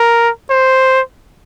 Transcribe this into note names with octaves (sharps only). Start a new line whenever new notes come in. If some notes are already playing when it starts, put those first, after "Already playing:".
Already playing: A#4
C5